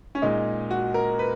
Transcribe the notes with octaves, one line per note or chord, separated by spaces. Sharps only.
C#4
A#2 G#3 D#4
F#4
A#4
B4